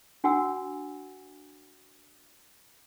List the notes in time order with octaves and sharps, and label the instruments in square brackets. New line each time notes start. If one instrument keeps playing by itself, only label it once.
[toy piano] D4 F#4 F#5 G#5 E6